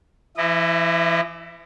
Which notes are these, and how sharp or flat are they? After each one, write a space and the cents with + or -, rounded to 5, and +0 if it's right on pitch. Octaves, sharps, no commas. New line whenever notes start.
E3 +40 E4 +0 D#5 -25